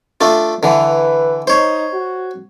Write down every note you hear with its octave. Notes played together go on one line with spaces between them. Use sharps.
A3 D4 F4
D3 E3 B4
D#4 C5 C#5
F#4